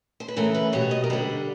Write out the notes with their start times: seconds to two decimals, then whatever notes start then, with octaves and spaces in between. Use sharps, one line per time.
0.20 C5
0.28 B4
0.36 C#3 E3 A3 A#4
0.54 B4
0.73 B2 G3 C#5
0.91 D#5
1.04 A#4
1.10 D3 G3 B4